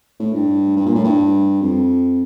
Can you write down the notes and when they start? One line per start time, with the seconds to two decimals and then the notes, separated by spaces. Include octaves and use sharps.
0.19 A2
0.33 G2
0.77 G2
0.86 A#2
0.95 A2
1.04 G2
1.61 F2